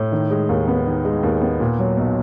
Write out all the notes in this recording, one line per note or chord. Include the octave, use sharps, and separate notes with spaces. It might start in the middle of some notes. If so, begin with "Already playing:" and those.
Already playing: A2
D#3
G#3
D#2
B3
D#3
G#3
D#2
B3
A#2
F#3
B1